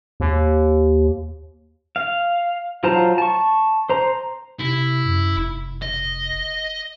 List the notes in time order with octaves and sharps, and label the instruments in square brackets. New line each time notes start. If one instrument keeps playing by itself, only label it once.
[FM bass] D#2
[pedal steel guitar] F5
F#3 F4 C5 A5 A#5
A5 C#6
C5 A#5
[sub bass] C3 [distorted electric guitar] E4
[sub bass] F#2
F1
[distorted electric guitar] D#5